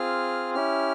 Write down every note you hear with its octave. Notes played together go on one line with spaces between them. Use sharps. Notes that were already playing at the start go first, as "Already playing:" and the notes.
Already playing: C4 F4 G#4 F6
C#4 E4 G4 F6